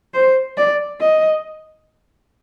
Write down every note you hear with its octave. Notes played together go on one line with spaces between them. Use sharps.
C5
D5
D#5